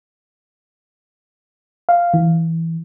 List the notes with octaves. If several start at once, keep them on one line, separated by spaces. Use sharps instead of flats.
F5
E3